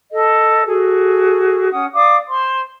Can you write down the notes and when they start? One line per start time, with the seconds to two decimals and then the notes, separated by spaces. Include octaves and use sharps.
0.11 A4 D#5
0.66 F#4 G#4 A4
1.71 C#4 F#5 D#6
1.93 D5 F5 D6 D#6
2.28 C5 C6